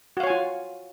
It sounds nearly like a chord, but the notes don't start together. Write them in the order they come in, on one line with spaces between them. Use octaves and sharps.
F#4 F5 C#5 G#5 F4